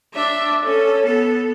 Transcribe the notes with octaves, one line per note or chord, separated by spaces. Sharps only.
D4 E5
C#4 A4
B3 A4